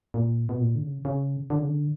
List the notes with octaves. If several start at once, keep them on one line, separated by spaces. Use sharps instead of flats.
A#2
B2
A#2
D3
C#3
C#3
D3
C#3
D3